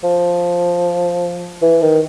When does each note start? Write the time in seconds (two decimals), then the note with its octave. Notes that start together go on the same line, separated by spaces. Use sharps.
0.04 F3
1.62 E3
1.82 D#3